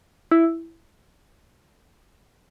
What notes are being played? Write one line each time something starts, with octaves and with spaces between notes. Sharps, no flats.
E4